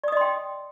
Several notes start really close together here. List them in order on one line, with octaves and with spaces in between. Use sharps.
D5 D#6 D#5 C6 G5